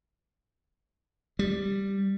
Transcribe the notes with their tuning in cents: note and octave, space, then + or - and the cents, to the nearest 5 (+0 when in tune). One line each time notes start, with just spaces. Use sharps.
G3 +5